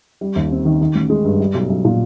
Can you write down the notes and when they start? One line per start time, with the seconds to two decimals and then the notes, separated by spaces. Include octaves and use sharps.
0.21 G3
0.36 D#2
0.51 C4
0.65 D#3
0.81 D#3
0.95 A1
1.10 G#3
1.25 G2
1.40 G3
1.54 B1
1.70 B1
1.85 A#2